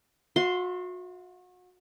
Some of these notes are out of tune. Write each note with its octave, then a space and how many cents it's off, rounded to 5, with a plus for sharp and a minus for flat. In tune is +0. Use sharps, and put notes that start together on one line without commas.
F#4 -35 E5 +20 C6 +0